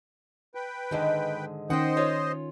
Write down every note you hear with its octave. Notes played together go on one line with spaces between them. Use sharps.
B4 G5
G#2 D3 D#3 G#3 D#5
D#3 C#4 C5 D#5 F#5 G5
F4 C#5